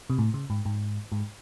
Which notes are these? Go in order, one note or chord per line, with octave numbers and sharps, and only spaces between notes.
C3
A2
C#3
G#2
G#2
G#2